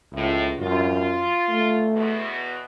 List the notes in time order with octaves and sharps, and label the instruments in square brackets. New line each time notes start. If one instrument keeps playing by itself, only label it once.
[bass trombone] C#2 [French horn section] A2
[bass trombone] F#2 [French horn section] F4
[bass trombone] A3
[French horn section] E2 B2